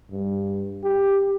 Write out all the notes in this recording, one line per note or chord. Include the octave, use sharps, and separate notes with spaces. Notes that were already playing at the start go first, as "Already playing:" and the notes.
G2
G4